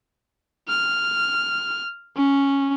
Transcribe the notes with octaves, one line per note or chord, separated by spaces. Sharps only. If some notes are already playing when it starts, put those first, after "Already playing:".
F6
C#4